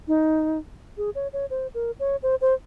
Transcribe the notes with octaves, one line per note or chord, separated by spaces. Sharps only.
D#4
G#4
C#5
C#5
C5
A#4
C#5
C5
C5